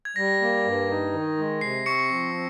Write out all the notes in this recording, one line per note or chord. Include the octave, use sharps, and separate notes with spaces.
G#6
G3 A#6
A#3
G2
D#4
D#3
G#3
C3 C7
C4 C#6 C#7
F3
C4